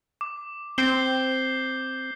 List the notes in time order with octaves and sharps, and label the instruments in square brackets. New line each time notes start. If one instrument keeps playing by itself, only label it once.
[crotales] D6
[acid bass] C4 [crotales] G6 C7 G7